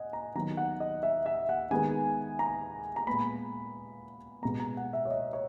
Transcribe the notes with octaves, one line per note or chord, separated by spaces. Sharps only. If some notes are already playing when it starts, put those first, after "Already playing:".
Already playing: D#5 F#5 G#5
A#5
D#3 F#3 B3 A#5
F#5
D#5
E5
E5
F#5
D#3 G#3 B3 G#5
A#5
A#5
A#2 G#3 B3 B5
B2 G#3 B3 A#5
A#5
F#5
E5
C#5
D#5
C#5